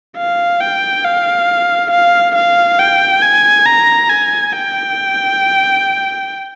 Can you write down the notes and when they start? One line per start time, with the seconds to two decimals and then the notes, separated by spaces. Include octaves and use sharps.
0.17 F5
0.61 G5
1.04 F5
1.91 F5
2.35 F5
2.79 G5
3.22 G#5
3.66 A#5
4.09 G#5
4.53 G5